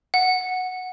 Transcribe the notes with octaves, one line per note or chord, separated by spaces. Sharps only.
F#5